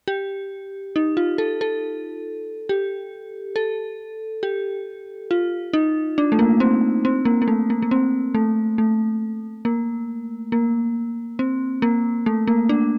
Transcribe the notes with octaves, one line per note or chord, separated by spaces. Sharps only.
G4
D#4
F4
A4
A4
G4
A4
G4
F4
D#4
D4
A3
A#3
C4
C4
A#3
A#3
A3
A#3
A#3
C4
A3
A3
A#3
A#3
C4
A#3
A3
A#3
D4